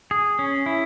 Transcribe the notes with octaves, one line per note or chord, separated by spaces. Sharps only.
G#4
C#4
E4